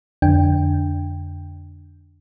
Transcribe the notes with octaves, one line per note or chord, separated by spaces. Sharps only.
F2 D3 D4 G5